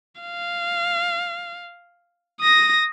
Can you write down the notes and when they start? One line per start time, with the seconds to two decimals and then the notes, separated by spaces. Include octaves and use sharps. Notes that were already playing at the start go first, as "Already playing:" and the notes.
0.21 F5
2.41 D#6 A#6